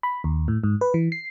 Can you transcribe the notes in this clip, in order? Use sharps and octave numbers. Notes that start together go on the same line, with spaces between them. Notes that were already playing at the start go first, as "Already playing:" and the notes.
B5
D#2
A2
G#2
B4
E3
C7